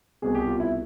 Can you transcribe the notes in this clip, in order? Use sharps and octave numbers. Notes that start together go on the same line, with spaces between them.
C2 B2 G#4
G4
F4
E4